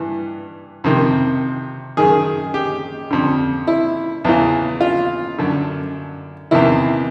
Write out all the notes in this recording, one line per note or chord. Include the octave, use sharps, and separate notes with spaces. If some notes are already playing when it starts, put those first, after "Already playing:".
Already playing: G2 E3
F2 C3 D#3
F#2 D#3 G#4
G4
F2 D3
E4
E2 C#3 E3
F4
F#2 D3
E2 C3 D#3 E4